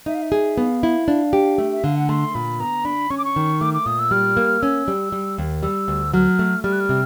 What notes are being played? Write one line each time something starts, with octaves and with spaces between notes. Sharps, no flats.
D#4 E5
F5
E5
G#4
B3 F5
E4
D4 F5
G4
A3 E5
E5
D3 F5
F#5
A3 C6
A#2 B5
B3 A#5
D4 B5
C#4 C#6
D6
C#6
D#3
A3 D6
D6
A#2 D#6
E6
G3 F6
A#3
C#4 E6
G3
G3
D#2
G3 E6
D2
F#3 F6
A3
G3 F6
F#6
F6
C3